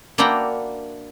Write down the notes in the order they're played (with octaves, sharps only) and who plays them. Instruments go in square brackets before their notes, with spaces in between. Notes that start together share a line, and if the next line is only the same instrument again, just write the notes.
[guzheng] A#3 D4 E4 F#4 G5 A#5